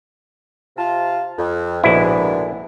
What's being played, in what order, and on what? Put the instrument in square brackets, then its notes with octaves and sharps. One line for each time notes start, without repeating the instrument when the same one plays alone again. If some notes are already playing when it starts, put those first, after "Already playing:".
[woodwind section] C3 F4 A5
F2
[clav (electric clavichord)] A#1 E4 [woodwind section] G#2 B2 D3